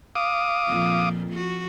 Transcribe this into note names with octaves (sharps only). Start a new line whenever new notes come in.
F5 D6 D#6
F2 A#2 F3
F3 F#4